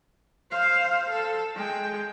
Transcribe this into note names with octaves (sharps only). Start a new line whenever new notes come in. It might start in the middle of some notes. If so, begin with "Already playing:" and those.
C5 F5
A4
G#3 G5